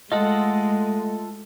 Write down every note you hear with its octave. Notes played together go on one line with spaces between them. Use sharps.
G#3 A3 F4 A4 D#5 F#5